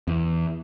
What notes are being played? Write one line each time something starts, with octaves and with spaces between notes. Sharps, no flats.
E2